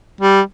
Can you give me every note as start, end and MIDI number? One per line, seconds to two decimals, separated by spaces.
0.21 0.41 55